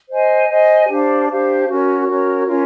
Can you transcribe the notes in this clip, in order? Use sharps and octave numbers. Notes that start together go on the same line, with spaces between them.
C5 D#5 G#5
C5 D#5 G#5
D4 G4 C5 F5
D4 G4 C5 F5
C#4 F#4 A#4 C#5
C#4 F#4 A#4 C#5
C#4 F4 A#4 C#5